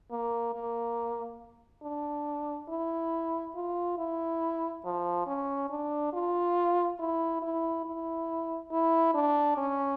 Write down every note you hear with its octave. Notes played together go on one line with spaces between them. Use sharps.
A#3
A#3
D4
E4
F4
E4
F3
C#4
D4
F4
E4
E4
E4
E4
D4
C#4